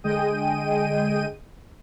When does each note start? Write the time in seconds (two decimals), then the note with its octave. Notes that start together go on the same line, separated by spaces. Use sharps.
0.04 D3 G#3 G#4 D#5 G5 D#7